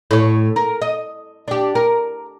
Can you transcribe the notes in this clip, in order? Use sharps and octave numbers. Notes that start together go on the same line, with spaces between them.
A2 C#5
A#4
D#5
D4 G4
A#4